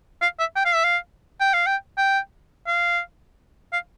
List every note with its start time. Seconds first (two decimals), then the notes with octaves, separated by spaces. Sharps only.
0.22 F5
0.39 E5
0.56 G5
0.65 F5
0.75 E5
0.84 F5
1.40 G5
1.53 F5
1.66 G5
1.98 G5
2.67 F5
3.73 F5